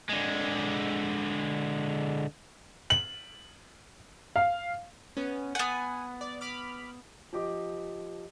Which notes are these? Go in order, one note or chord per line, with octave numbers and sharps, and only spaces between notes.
D3 G#3
F#7
F5
B3 C#4
B3 F#5 G#5
D5
B5 D6 F6
F3 G4 D#5 D6